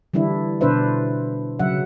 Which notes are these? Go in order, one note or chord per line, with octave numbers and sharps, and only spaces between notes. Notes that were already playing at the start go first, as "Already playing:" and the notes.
D3 E3 G3 D4 E4
B2 D3 D4 B4 C5 E5
C#3 F#3 E5 F#5